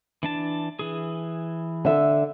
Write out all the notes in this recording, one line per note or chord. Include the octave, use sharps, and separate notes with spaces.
E3 D4 A5
E3 G#4
D3 E5